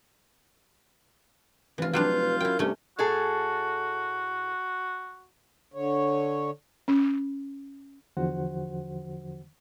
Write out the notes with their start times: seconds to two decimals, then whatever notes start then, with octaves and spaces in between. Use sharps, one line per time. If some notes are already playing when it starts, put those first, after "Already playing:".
1.78 F1 E3 F4
1.93 F#3 G3 D4 F4 B4 F5 G6
2.40 F#2 E4 A#4 G5
2.59 G2 C3 A3 C#4
2.99 A2 F#4 G#4 A4
5.74 D3 C#5
6.88 C#4
8.17 E2 D3 F3 F#4 C5 F#5